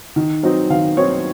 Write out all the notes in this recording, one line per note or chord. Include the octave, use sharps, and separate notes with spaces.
D#3
F#3 C4 D#4
D#3 F5
F#3 C4 D#4 C#5